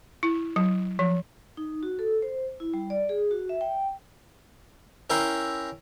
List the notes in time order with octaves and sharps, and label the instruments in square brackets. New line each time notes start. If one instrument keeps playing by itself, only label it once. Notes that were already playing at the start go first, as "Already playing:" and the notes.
[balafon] E4
F#3
F3
[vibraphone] D#4
F#4
A4
C5
E4
G3
D5
G#4
F#4
E5
G5
[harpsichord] C#4 E4 A#4 G5 A#5 C6